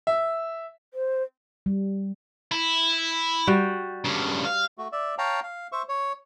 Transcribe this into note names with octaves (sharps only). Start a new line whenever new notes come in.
E5
C5
G3
E4
G3 F#4 G5
G2 C#3
F5
A3 F#4
D5 E5
C#5 F5 G5 A5 A#5
F5
C5 E5 C#6
C#5